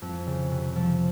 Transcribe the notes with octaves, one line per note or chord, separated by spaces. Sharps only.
F2
C#3
C3
F3